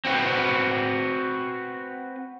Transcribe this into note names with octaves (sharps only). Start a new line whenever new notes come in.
C4 F#4 B4